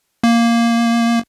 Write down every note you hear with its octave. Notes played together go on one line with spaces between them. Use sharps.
A#3